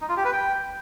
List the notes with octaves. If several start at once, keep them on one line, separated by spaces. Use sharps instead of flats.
D#4
F4
G4
B4
G5